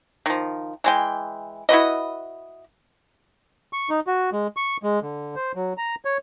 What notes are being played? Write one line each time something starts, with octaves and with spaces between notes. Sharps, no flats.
D#3 F3
E3 G#3 G5
E4 F#4 B4 D#5
C#6
D#4
F#4
G#3
C#6
G#3
D3
C5
F#3
A#5
C#5